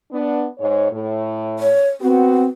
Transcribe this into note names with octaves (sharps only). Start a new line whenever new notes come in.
B3 D4
G#2 C#5
A2
C#5
B3 C4 F#4